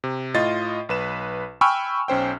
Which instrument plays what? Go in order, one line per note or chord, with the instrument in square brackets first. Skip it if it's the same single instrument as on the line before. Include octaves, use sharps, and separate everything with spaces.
[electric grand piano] C3
A2 F4 D#5 A6
B1 B4 E7
G5 G#5 B5 C#6 E6 F6
B1 C#4 C5 G5